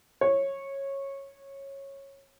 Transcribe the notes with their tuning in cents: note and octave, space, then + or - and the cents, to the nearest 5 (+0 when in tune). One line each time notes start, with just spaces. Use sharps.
C#5 -15